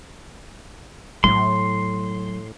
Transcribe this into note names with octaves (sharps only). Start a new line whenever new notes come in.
A2 F#3 C6